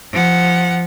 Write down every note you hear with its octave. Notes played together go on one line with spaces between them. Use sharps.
F3 F#5